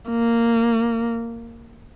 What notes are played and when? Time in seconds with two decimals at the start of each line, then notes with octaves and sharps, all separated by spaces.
0.11 A#3